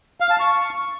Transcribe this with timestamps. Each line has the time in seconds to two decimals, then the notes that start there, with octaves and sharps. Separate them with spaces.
0.20 F5
0.30 A5
0.40 C#6